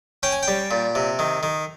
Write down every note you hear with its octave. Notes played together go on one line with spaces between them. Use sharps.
C#4 G5
G#5
G5
G3
A#2
C3
D#3
D#3